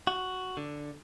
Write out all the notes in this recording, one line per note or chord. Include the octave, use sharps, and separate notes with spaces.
F#4
D3